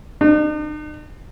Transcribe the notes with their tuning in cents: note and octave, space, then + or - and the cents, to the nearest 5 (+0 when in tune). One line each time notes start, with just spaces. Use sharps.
D#4 -45